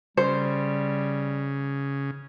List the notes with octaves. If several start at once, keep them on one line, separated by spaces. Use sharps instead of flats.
C#3 G3 C5